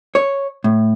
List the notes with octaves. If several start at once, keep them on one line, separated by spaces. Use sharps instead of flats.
C#5
A2